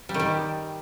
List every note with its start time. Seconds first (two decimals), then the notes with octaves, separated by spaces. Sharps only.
0.09 G3
0.14 D#3
0.20 G3